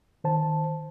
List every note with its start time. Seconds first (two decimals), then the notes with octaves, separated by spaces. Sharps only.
0.24 D#3 C5 A5